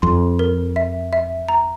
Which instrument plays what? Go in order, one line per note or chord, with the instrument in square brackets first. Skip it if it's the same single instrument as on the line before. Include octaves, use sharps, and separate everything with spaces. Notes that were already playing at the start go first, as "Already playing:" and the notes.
[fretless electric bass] F2 [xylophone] C6
[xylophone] A#4
E5
E5
A#5